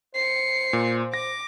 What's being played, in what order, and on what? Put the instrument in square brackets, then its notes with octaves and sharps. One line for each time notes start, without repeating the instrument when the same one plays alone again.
[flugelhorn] C5 [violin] C7 C#7
[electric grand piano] A#2
[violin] D6 [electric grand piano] A#6